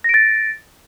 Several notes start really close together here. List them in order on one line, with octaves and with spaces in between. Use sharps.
A#6 D7 A6